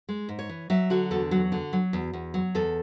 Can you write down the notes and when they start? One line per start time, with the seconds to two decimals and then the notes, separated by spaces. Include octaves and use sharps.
0.09 G#3
0.29 G#2
0.39 C#5
0.49 E3
0.70 F#3 E5
0.90 D3 F#4
1.11 E2 A4
1.31 F#3 F#4
1.52 D3
1.73 F#3
1.93 E2
2.13 E2
2.34 F#3
2.55 E2 A4